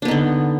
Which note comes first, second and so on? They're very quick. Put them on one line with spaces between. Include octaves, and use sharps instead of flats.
D4 B3 D#4 D3